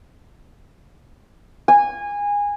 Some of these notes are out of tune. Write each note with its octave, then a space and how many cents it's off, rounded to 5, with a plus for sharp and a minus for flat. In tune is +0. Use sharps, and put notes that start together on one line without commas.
G#5 -20